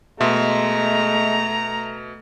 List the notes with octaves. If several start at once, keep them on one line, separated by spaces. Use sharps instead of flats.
B2 G#3 A3 E5 A#5 C6